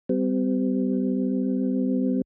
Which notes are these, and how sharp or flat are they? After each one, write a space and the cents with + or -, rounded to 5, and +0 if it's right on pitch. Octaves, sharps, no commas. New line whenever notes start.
G3 -10 C4 -45